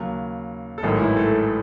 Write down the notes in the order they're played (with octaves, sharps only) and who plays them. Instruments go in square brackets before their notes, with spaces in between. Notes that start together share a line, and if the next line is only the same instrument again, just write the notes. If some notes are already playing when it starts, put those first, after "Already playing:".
Already playing: [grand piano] D#2 C#3 F#3
A4
A1 G#2 D#3 F#3 G#3 G#4
E3 E4
A3 A4